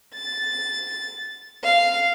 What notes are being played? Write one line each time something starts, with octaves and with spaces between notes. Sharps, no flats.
A6
F5